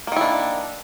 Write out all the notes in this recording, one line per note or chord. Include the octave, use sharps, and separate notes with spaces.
D#3 A#3 D4 E4